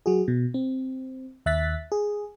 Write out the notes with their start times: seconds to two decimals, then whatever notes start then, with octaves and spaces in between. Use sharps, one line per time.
0.06 F#3 F#4 G#4
0.28 B2
0.54 C4
1.46 D#2 E5 F#6 A6 B6
1.92 G#4